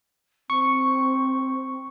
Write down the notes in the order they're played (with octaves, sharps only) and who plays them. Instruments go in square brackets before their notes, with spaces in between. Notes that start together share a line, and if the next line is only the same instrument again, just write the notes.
[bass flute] C4 [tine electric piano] C#6